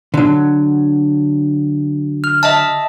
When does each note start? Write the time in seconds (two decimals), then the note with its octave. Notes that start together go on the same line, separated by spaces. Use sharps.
0.14 D3 F#3
2.24 F6
2.43 D#5 E5 A5